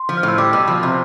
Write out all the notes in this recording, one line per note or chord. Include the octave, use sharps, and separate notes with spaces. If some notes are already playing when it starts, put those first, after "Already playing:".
Already playing: C6
F3
F6
A2
E6
G3 D6
B2 E6
F3
C3